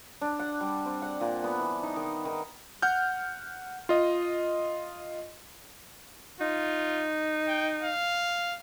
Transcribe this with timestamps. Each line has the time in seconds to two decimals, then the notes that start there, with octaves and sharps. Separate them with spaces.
0.21 D4
0.39 F#5
0.60 G3
0.86 C4
1.02 F#5
1.21 A#2
1.44 B3
1.59 E3
1.83 D#4
1.96 D#3
2.25 D#3
2.82 F#5 F6 G6
3.89 F4 D#5
6.41 D#4 F4
7.47 G5
7.82 F5